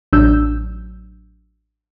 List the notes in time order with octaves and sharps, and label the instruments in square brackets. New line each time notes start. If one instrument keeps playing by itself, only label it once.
[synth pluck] A1 F#3 D4 E6 G6